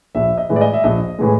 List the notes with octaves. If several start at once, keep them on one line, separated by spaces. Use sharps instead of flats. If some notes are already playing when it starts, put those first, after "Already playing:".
A#1 E5
D#5
A2 E3 G#3
D5
D#5
E5
A#1 D#5
A2 E3 G#3